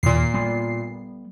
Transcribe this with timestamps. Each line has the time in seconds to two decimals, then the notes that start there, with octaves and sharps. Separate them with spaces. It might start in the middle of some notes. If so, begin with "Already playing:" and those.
0.03 D#2 A#2 C7
0.34 G3 B3